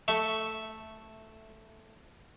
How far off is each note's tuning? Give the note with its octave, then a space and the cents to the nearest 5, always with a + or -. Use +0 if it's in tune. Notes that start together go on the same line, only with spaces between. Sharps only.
A3 +0 E5 -5 C#6 +0